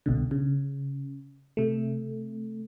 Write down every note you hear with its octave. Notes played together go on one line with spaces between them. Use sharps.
C2 B2 D3
C#3
C3 A3